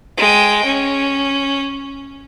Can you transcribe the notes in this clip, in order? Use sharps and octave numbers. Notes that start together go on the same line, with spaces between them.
G#3 G5
C#4